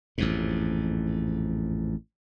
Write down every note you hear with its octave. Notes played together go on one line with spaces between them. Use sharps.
A1 F2 G#2